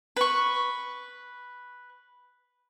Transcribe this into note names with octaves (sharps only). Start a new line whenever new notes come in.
B4 C#6